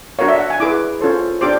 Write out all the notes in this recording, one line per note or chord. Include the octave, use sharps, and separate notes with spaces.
D4 F#4 A#4 C#5 F5
E5
F#5
G#5
E4 G#4 B4 D6
C#4 F4 A4 C5
D4 G4 C5 D6